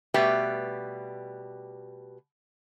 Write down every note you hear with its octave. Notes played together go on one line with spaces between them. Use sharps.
B2 G3 A3 G4 B4 E5